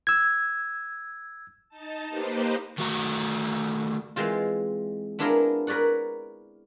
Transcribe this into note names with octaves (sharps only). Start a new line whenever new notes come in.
E6 G#6
D#4 A5
A#3 D#4 G4 B4 C5
D#3 A3 F#4 D5 A#5
E3 G#3 C4 F4
B3 D4 E4 F4 G#4 A#4
A#4 B4 C#5 D5 F#5